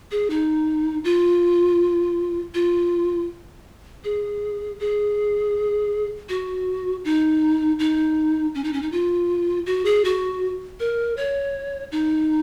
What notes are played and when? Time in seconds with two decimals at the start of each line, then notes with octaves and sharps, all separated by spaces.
0.11 G#4
0.30 D#4
1.04 F4
2.54 F4
4.04 G#4
4.80 G#4
6.29 F#4
7.05 D#4
7.79 D#4
8.55 C#4
8.64 D#4
8.73 C#4
8.82 D#4
8.92 F4
9.66 F#4
9.85 G#4
10.05 F#4
10.80 A#4
11.17 C#5
11.92 D#4